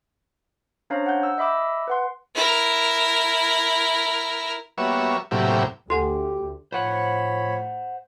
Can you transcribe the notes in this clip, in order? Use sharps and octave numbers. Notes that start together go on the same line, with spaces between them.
C#4 D4 C5 C#5 F5 A#5
F#5 G6
E6
D#5 E5 B5 D6 E6
B4 F#5 C6
E4 A#4
G3 A#3 B3 F#4 C#5 E5
A2 C3 F#3 A#3 E4 G4
D2 F#4 G4 A4 F#5 G#5
A2 F3 C5 C#5 F#5 B5